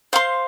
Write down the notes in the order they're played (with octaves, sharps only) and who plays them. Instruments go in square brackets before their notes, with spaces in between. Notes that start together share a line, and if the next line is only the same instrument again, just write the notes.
[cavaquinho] C5 F5 C6